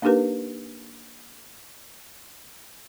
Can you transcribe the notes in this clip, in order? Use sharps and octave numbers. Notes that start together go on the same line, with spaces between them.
A#3 D4 D#4 G4 A#4 B4